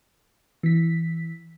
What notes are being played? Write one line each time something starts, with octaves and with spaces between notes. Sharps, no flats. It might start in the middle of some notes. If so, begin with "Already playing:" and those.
E3 B6